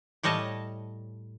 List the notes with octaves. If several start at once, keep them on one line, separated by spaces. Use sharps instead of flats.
A2 G3 C#5 D#5 A5